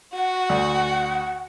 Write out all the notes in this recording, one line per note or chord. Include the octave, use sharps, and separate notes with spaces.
F#4 F#5
D2